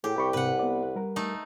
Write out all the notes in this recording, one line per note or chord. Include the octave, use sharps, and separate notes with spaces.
A2 G4 G#4
C2 G5 B5 C#6
G#2 C3 B4 F#5
B3 D5
G3 A#4
A3 D#4